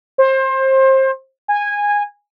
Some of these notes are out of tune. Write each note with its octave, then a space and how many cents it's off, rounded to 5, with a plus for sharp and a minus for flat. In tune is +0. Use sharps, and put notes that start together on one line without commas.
C5 +25
G#5 -15